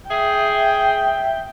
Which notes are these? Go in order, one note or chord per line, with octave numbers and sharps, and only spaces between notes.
G#4 E5 G5